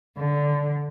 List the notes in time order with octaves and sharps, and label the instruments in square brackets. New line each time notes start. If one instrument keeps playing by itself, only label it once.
[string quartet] D3